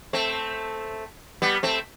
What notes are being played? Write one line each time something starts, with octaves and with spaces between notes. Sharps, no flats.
A3 C4
G3 B3
A3 C4